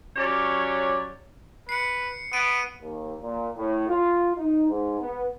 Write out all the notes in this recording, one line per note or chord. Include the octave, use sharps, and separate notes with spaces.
F#3 C#4 G4 C#5 D5
B4 C7 C#7
B3 D7 D#7
D#2
A#2
A2
F4
D#4
G#2
B3